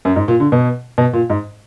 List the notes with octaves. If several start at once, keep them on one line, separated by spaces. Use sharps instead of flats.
F#2
G#2
A#2
D3
B2
B2
A#2
G#2